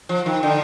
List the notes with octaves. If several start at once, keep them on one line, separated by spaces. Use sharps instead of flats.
F3
D#3
D3